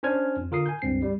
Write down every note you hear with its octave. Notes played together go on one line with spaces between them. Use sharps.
C#4 D4 C5 G#5 F6 G#6
F2
D3 F4 A#4 D#6 C7
G#5 G6
C#2 G2 C4 C7
G3